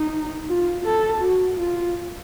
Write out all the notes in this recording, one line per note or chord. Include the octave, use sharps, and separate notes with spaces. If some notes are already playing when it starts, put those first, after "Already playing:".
Already playing: D#4
F4
A4
F#4
F4